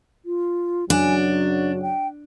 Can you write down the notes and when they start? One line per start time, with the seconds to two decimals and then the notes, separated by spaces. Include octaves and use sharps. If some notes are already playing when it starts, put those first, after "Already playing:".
0.25 F4
0.90 F#2 C#3 F#3 D4 G#5
1.27 F#4
1.82 G5